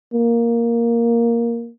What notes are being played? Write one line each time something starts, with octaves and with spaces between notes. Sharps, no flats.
A#3